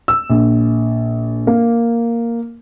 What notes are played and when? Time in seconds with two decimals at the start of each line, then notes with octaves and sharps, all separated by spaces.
0.08 E6
0.30 A#1
1.47 A#3